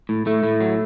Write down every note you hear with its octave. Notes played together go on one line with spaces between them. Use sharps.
A2
A2 A3
A2
F#3